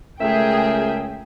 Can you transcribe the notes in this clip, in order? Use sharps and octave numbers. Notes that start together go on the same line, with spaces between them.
C#2 A3 G#4 A#4 E5 G5